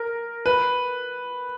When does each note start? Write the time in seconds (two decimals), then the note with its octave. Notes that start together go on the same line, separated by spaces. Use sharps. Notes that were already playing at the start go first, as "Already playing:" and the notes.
Already playing: A#4
0.46 B4